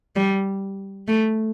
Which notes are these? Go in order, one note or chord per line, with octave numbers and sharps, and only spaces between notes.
G3
A3